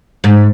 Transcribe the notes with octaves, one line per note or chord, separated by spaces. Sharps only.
G#2